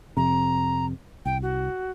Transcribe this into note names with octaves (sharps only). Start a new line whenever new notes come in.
F2 C3 A#5
C2 G5
F#4